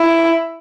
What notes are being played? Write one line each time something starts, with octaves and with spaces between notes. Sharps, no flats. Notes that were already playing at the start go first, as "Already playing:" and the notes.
Already playing: E4